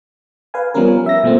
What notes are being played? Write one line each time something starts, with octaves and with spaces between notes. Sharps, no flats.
B4 F5 G#5
F3 G3 B3 C#4 A#4
E5 A#6
B2 F3 A3 A#3 C4